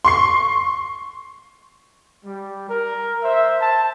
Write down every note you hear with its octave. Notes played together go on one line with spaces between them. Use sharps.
C6 C#6 C7
G3
A#4
C5 E5
A5